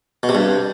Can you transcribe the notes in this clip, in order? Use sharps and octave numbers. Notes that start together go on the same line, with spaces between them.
B2
C3
G2